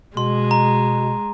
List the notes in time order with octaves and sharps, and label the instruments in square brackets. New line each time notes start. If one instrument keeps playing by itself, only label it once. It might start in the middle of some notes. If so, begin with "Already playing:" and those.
[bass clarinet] B2 [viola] G#3 [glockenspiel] C6
[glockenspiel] A#5